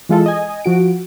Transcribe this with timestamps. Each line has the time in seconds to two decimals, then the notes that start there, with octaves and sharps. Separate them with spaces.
0.09 E3 G#3 F4 A4
0.26 D#5 G#5
0.64 F3 F#4 D7